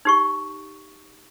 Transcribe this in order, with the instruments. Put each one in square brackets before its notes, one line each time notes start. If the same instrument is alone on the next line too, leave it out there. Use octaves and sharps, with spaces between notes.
[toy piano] D#4 G4 C#6